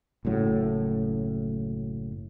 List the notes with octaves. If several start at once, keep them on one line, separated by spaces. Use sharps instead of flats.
F#1 F#2 A2 F#3